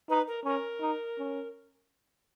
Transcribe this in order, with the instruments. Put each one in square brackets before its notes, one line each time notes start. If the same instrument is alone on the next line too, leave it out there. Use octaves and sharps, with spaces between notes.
[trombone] D#4 [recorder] B4
[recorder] A#4
[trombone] C#4 [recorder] A#4
[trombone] D#4
C#4